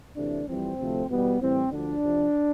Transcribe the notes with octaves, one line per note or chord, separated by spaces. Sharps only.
D2 C3 E3 A3 D4
F2 E3 G3 C4
D2 C3 F3 A3
E2 B2 G3 B3
A2 E3 G3 C4
D2 D3 F3 D4
F2 C3 F3